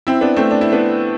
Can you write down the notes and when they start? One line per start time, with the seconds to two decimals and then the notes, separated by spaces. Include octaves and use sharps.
0.07 C4 E4
0.21 B3 D4
0.36 A3 C4
0.51 D4
0.61 E4
0.72 B3 D4